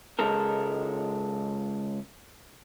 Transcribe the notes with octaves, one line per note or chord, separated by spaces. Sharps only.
C#2 G#3 A4 A#4